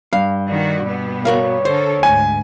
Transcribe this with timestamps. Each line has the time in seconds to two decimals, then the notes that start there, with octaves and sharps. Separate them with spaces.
0.13 G2 F5
0.48 D#3 F#4 D5
0.85 B2 B3
1.25 F#4 A#4 C#5 F5
1.65 D3 A4 A#4 C5
2.03 D2 G#2 G#5